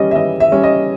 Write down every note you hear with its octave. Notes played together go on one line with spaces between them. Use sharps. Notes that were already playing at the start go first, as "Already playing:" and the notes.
Already playing: E3 G3 C#4 D#5
E5
E3 D#5
E5
G3 C#4
D#5